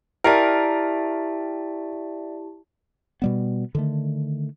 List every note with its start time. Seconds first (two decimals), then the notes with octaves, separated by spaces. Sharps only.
0.24 E4 G4 A#4 D5 E5 G5 A5
3.22 B2 G3 B3
3.75 D3 D#3 A3